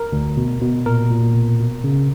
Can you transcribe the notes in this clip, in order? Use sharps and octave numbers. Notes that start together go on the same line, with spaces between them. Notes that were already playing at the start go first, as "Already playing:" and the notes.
Already playing: A#4
D2
B2
B2
A#2 A#4
A#2
B2
B2
C#3